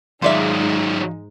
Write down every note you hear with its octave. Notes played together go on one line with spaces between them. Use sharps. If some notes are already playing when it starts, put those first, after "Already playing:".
G#2 D#3 F#3 G#3 D#4 F4 D5 E5